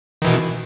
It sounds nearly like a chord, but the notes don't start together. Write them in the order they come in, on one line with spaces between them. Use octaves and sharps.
D#3 E3 B2